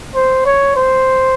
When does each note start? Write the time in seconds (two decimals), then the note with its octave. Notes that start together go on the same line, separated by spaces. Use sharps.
0.15 C5
0.46 C#5
0.76 C5